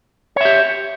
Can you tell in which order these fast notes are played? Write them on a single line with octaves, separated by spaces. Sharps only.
C#5 E5 G4